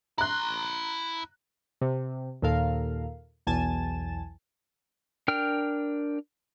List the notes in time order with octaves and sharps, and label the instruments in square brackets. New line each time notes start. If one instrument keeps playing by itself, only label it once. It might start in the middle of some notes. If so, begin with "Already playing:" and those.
[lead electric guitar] E4 C6 [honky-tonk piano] A#5 F#6
[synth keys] C3
D#2 A#2 A4 A#4 F5
B1 E2 G#5 A5 A6 E7
[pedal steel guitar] D4 A#4 G5 F6